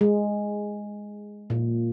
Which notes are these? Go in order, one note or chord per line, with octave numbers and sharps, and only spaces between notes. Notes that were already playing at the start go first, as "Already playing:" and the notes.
G#3
A#2